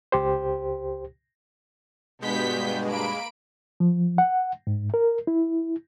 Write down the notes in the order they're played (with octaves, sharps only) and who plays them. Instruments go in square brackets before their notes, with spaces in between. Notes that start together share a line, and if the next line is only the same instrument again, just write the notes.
[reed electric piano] C#2 G4 C5
[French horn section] G2 B2 [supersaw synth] G#3 [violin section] B3 G6 B6
[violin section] A#3 B5 D7
[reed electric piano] F3
F#5
G#2
A#4
E4